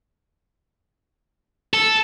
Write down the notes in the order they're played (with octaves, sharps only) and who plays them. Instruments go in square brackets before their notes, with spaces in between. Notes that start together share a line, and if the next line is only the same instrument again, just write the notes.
[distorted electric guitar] A4